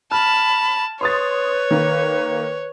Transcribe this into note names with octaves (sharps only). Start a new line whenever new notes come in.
A5 B5 F6
B4 C#5 C6 D#6 A6
D#3 A#3